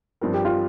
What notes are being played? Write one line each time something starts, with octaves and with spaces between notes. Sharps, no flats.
G2 F3 C4 A#4
G4
F4